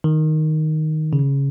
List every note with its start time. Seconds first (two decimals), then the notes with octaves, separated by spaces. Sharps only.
0.04 D#3
1.13 C#3